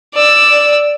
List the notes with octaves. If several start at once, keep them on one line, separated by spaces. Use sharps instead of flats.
D5 E6